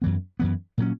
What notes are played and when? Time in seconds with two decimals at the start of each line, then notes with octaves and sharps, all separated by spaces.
0.02 F#2 E3 B3
0.40 F#2 E3 B3
0.78 A#2 F#3 C#4